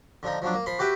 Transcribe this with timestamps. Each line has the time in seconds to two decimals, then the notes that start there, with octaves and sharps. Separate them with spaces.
0.23 D3 F3 D#4
0.42 F3 F#3 D4
0.54 A#3
0.66 F3 B5 C6
0.79 F#4 G4 B4 E5 G5